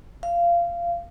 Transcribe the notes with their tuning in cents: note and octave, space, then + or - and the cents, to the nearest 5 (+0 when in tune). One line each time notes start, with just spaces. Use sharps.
F5 -20